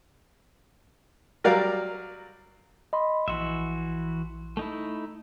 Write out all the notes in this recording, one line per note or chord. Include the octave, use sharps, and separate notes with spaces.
F#3 G3 A#4 D5 F5
D#5 B5 C6
A#1 E3 F#4 E5 C6
A3 D#4 E4